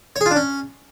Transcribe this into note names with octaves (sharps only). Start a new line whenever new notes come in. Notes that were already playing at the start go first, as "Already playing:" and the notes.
C#5
G#4
F4
D4
C#4